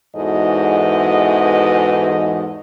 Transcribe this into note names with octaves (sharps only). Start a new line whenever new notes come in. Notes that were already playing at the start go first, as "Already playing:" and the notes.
E2 G#2 E3 F#4 A4 D#5